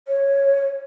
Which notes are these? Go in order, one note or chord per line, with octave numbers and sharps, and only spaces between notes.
C#5